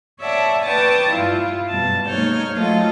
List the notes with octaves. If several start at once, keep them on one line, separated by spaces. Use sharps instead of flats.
C#5 D5 E5 F#5 A5
B4 D5 G5 A5 C#6 D#6
G2 E4 F4
F#2 B2 G3 A5
G#3 A#3 D#4 C#5 F6 G6
F#3 A3 F4 A4 D#5